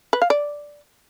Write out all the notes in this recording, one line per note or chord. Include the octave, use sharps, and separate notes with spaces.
B4
F5
D5